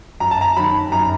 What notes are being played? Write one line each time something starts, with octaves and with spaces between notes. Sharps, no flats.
F#2 A#5
A5
A#5
D#3 F#3 B5
F#2 A#5